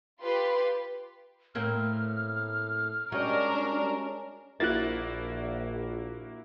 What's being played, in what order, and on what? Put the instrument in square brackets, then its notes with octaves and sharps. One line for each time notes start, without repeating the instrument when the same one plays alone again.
[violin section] F4 G4 B4 C6
[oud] A2 A#3 C4 [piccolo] F6
[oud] G3 D#5 [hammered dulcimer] G#3 C#4 F#4 [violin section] D4 A#4
[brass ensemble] A#1 [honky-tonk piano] A#3 E4 F#4 [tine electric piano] F#6 A6